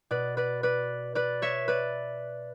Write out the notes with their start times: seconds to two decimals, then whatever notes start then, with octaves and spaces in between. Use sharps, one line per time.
0.11 B2 B4 D5
0.37 B4 D5
0.63 B4 D5
1.15 B4 D5
1.42 C#5 E5
1.68 B4 D5